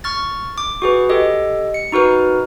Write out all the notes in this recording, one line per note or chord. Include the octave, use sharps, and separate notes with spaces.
C#6 F6 A6
D6
F#4 G#4 B4
G4 A4 D#5
C#7
D#4 F#4 A#4 B4